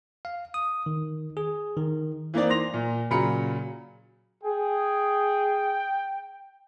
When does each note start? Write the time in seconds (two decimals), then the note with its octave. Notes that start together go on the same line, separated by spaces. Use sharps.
0.25 F5
0.54 D#6
0.86 D#3
1.37 G#4
1.77 D#3
2.34 E3 A#3 C4 D#4 D5
2.50 C6 A#6 F7
2.74 A#2
3.10 A#2 C#3 F#3 A#5 B5 C#7
4.44 G#4 G5